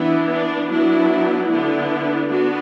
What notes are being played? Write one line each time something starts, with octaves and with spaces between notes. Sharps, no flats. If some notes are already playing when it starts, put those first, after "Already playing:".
Already playing: E3 B3 D4 E4
D4
F#3 B3 D4 E4
D3 B3 D4 E4
B3 D4 F#4